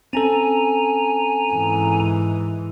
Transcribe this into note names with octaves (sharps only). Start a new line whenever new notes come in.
C4 C#4 A4 G#5 A#5
G#2 E3